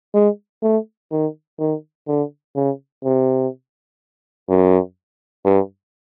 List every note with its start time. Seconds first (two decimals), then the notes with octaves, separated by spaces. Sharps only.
0.14 G#3
0.62 A3
1.11 D#3
1.59 D#3
2.08 D3
2.55 C#3
3.04 C3
4.49 F#2
5.45 G2